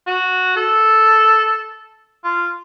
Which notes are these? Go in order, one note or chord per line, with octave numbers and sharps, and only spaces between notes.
F#4
A4
F4